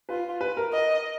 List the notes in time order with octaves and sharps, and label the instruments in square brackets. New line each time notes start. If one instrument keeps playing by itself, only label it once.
[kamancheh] F4 [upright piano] B4
[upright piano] B4
A#4
[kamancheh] D#5